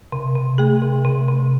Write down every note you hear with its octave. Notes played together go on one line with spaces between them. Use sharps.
C3
C3
A3 G#4
C3
C3
C3